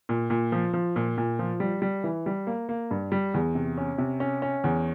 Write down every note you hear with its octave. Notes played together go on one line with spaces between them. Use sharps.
A#2
A#2
F3
F3
A#2
A#2
F3
G3
G3
E3
G3
A#3
A#3
G2
G3
E2
C3
C#4
C3
C#4
C#4
E2